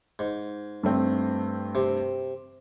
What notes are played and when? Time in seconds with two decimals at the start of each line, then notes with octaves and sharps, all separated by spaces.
0.19 G#2
0.83 G2 A3 C4
1.75 C3